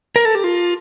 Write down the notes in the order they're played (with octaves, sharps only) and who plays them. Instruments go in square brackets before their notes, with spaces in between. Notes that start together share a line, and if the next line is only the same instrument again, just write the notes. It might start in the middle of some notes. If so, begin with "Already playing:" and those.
[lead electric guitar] A#4
A4
G4
F4